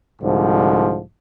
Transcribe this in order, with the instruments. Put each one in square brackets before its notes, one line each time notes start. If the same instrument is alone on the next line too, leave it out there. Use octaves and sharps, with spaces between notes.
[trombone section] C2 G#2 D3 F3